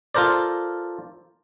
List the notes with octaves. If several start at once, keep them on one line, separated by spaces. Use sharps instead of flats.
F4 A4 A#4 C5 D5